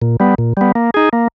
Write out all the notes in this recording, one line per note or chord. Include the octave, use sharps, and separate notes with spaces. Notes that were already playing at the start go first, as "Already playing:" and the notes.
A#2
G3 B3
A#2
G3 B3
A#3
D#4 G#4
A#3